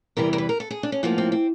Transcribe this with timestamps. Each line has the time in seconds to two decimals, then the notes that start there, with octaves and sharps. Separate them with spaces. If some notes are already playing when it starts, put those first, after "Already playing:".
0.17 E2 C3 E3 G3 A#4
0.33 A#4
0.38 B4
0.49 A#4
0.60 A4
0.71 G#4
0.83 D4
0.92 C#4
1.03 A2 F3 A#3 B3
1.18 C4
1.32 C4